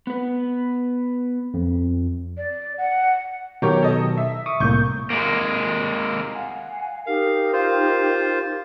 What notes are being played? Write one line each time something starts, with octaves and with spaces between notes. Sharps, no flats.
B3 B4
F2
D5
F#5
B2 D#3 F#3 G4 A#4 C#5
A4 D#5
E5
C#6 D#6
C2 A2 A#3 C#6 G6
G#3 A#3
F5 F#5 G#5
D#4 G4 A#4 F5
F4 C5